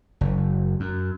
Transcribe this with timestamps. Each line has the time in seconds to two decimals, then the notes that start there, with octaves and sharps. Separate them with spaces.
0.21 F#1
0.80 F#2